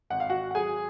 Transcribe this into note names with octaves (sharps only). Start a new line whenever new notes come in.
G#1 F#5
F5
F#4 F#5
F#5
F#3 G#4 G#5